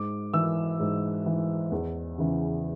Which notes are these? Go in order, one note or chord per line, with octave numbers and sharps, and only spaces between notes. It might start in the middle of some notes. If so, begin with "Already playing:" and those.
Already playing: G#2 D6
E3 E6
G#2
E3
E2
C#3 E3